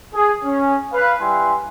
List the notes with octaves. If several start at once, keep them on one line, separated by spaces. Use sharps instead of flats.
G#4
C#4
B4 F5
G3 E4 G#5 C6